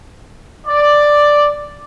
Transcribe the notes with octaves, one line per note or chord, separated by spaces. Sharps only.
D5